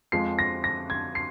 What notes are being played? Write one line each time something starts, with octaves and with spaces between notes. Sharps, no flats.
F2 F3 G#3 C7
A#6
A#6
G#6
C7